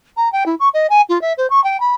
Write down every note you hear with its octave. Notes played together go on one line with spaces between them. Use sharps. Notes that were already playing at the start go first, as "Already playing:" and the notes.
A#5
G5
E4
C#6
D#5
G#5
F4
E5
C5
C#6
G5
B5